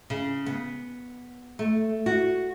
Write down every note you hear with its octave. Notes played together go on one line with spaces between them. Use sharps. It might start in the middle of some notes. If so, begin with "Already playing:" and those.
C#3
B3
A3
F#4